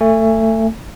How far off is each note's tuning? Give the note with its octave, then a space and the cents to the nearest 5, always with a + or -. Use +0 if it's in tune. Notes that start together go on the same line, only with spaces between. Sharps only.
A3 +20 G#5 -15